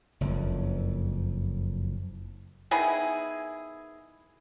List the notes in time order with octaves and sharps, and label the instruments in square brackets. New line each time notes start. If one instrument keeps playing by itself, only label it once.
[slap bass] F#1 F2
[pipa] D#3 B3 E4 G#4